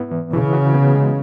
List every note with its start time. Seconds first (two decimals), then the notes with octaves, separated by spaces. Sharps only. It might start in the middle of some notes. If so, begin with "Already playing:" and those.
Already playing: G#2 B3 E4
0.11 E3
0.33 C#3 E3
0.53 F#4
0.74 B3
0.95 G#3